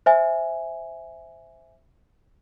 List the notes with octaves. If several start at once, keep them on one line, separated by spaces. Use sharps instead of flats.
C5 E5 G#5